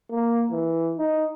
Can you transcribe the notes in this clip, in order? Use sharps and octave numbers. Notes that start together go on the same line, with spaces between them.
A#3
E3
D#4